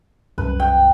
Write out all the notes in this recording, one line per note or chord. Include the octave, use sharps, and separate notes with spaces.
C2 F#2 B4
G5